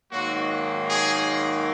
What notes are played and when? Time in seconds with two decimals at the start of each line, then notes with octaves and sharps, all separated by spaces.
0.11 G#2 D#3 F#3 A#3 F#4
0.89 G#4